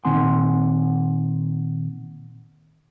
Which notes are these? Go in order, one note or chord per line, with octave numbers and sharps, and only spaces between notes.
A#2 D#3 C4 F#5 G#5 C6